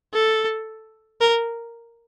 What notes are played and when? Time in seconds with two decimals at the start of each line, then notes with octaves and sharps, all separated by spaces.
0.14 A4
1.21 A#4